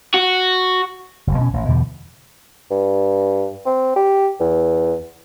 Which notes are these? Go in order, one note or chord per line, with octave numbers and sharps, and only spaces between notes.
F#4
F#1 B1
B2 C#4
A1
E2 B2 D3 G3
G2
C4
G4
E2